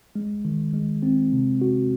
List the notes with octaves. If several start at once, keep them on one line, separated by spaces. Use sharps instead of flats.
G#3
D#3
G#3
C4
C3
F#4